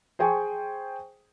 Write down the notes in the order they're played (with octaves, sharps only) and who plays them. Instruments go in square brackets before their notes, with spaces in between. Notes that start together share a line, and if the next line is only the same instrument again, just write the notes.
[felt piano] G#4 C5 G5 G#5 C#6